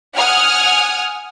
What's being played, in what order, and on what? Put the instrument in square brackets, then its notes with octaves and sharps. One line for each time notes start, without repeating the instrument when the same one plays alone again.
[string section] F#5 G#5 D#6 F6